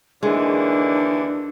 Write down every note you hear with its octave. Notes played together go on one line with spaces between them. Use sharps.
D#2 D3 E3 G#3 D4